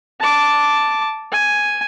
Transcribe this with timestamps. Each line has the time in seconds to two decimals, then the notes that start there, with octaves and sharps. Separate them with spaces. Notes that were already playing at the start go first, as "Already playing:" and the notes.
0.20 A5 D6
1.32 G#5